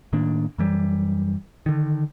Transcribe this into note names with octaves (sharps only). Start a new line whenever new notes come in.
A2 D#3 A#3 D4
F#2 E3 G3
D3 D#3